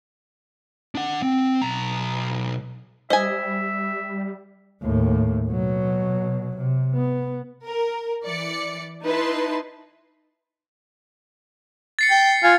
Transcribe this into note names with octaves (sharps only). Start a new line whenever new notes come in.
D4 F#5
C4
B1 A#5
G3 C5 D#5 E5 G#5
D#2 A2
B2 F#3
C3
B3
A#4
E3 D5 C#7
D#4 E4 B4 A5 C6
A6 C7 C#7
G5
F4 G#5